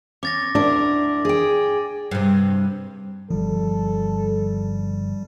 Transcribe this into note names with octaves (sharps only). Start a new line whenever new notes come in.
C#4 D6 A6 A#6
D2 D4 E4 A#4 D6
G#4 G5
G2 C3
G1 F3 G3 A4